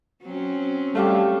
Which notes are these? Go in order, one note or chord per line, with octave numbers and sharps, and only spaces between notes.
F#3 C4 C#4
G3 A3 G4 F5 A5